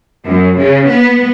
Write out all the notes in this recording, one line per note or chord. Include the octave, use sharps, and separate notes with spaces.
F#2
C#3
B3